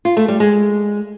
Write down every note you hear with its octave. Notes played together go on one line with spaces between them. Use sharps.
F4
A3
G3
G#3